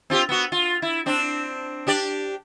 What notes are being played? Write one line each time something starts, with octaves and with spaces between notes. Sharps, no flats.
C4 F4 G4
B3 F#4
F4
E4
C4 D4
D4 G4 D5